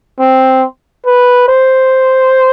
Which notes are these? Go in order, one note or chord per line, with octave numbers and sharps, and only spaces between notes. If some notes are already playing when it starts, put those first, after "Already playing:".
C4
B4
C5